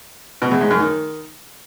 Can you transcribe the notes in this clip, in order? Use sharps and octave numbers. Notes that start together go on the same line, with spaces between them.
B2
E2
G#2
F#2
D#3